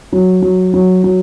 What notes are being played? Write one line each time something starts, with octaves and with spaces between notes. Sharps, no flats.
F#3
F#3
F#3
F#3